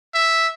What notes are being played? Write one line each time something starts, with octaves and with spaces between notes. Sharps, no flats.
E5